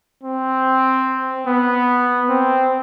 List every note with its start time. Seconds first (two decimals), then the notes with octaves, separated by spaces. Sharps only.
0.23 C4
1.47 B3
2.29 C4